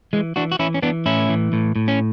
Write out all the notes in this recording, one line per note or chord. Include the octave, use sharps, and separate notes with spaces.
E3 G#3
E3 D4 F#4
F#4
E3 C#4 E4
C#4
E3 B3 D4
A2 C#4 E4
E3
A2
A2
C#4